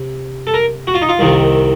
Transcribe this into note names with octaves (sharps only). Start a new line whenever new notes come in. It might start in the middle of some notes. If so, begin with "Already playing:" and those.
Already playing: C3
A4
A#4
F#4
F4
D#4
F4
C2 C3 D#3